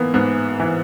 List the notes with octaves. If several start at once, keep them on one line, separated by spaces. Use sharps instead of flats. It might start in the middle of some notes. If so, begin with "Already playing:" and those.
Already playing: G#2 E3 A#3 B3
G#2 B3
E3